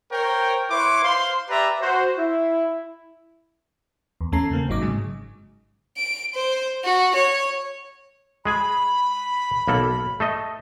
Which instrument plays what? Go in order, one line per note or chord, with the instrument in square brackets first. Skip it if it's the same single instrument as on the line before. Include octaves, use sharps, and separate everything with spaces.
[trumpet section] A#4 C5 C#5 G5
E4 B4 C#5 C6 D6
C5 F5 C6
G4 B4 D5 E5 A#5
F#4 C5
E4
[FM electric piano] E2
E2 A3 C#4 A5 A#5 C7
C#3 A#3 C4
G#1 F#3 D#4 D6
G#2 C#3 F#3 G#3
[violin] D7
C5
F#4
C#5
[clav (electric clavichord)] G#3 G#4 G#5 [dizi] B5
[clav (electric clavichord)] B1 A#3 A4
A3 A4 D#5